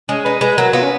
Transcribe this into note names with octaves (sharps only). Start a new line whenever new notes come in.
G#3 C#4
D#4 B4
G#3 B4
F#3 A#4
B3 F4
C#4